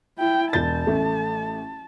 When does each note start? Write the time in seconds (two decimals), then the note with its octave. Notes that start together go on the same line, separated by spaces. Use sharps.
0.18 E4 G5
0.53 E1 A5 G6 A6
0.87 A1 A3